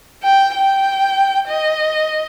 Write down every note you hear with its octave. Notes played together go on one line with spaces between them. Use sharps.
G5
G5
D#5